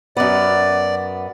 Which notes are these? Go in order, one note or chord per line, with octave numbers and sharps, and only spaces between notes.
F#2 B3 D5